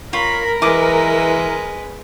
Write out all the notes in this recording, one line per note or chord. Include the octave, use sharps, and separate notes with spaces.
F4 A#4 C#5 B5
E3 G#3 B4 D#5 D6